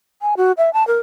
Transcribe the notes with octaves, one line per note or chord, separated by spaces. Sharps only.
G#5
F#4
E5
A5
A#4